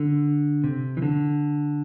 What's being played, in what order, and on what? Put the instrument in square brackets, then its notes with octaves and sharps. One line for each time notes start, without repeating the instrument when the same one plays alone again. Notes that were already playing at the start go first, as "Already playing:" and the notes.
Already playing: [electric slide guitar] D3
C3
E3
D3